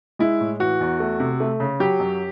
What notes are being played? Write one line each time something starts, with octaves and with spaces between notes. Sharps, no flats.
G#3 E4
A2
E3 F#4
E2
A3
C3
A3
C#3
F#3 G4
F#2